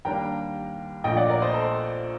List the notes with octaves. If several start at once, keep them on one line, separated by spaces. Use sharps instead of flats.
D#2 D#3 G3 A#3 D4 G5 A#5
A#1 A#2 A3 D#5 G5
D5 F#5
A#4 D5
C5 D#5
A4 C5